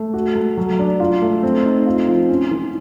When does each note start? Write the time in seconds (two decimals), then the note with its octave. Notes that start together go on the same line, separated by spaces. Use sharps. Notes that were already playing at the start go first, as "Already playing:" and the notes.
Already playing: A3
0.14 F#4
0.35 A3
0.57 F#3
0.79 D4
1.00 F4
1.22 A3
1.43 C4
1.65 D#4
1.87 F4
2.08 F3
2.29 C#4
2.51 E3